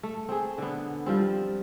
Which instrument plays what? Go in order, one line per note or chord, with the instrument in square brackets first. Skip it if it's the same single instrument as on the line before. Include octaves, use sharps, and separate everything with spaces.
[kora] A3
C4 G#4
D3 B3
F3 G3 C4